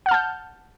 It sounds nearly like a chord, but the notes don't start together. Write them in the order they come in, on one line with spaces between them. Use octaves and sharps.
F#5 F6 A5 G6